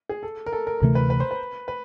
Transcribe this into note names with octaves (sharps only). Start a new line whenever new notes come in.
G#4
A4
A#4
A4
A#4
D2 C3 E3 A3 A#4
B4
B4
C5
B4
B4